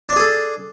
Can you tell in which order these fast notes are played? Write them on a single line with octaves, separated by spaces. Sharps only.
D4 D5 G#4 A4